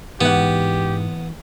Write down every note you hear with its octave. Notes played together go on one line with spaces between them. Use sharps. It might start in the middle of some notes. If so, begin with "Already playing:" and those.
G#2 E3 B3 G4 F#5